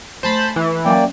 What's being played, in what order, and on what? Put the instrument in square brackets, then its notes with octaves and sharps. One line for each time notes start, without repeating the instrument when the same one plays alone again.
[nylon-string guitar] A3 G#5 [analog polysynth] C5 A5 B5
[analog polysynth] E3
[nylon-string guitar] F#3 C#4 E5 [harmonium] A#3 D5 G5